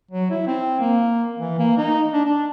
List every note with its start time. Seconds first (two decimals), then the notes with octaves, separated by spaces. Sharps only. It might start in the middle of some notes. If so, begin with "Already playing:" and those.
0.11 F#3
0.30 E4
0.47 C4
0.80 A#3
1.38 E3
1.59 A#3
1.78 D#4
2.13 D4
2.24 D4